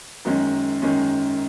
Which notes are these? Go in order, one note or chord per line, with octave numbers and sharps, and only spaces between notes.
F#2 D#3 G#3 C#4
F#2 D#3 G#3 C#4